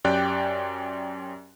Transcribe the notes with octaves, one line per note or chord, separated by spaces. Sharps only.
F#2 C#4 G4 D5 G5 F#6